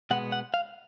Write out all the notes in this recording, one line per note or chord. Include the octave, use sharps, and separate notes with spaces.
B2 G#3 B3 F#5
F#5
F5